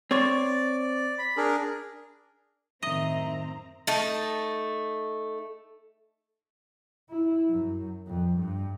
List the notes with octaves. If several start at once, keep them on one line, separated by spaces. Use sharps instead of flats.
C4 C#5 D5
B5
D4 G#4 A#4
F#2 A2 D#3 C4 D#5 E5 A#5
A3 D#4 A5
E4
F#2
F2
G2